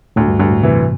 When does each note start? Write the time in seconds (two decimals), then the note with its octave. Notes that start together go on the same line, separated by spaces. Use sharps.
0.16 D2 A2
0.28 G2
0.39 D2 G2
0.51 A2
0.63 C3 E3